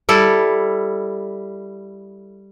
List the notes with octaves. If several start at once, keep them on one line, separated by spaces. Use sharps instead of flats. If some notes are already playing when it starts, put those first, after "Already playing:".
G3 E4 A4